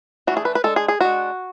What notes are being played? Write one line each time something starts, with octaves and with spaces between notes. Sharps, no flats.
E3 A3 D4 F#4
G#4
B4
B4
G#3 D4 A4
G#4
G#4
G#3 D4 F#4